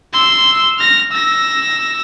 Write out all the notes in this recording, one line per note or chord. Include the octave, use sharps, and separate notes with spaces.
C6 E6
F6 A#6
E6 A#6